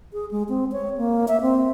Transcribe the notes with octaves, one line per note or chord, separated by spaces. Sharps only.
G#4
G#3
C4
C#5
A#3
E5
C4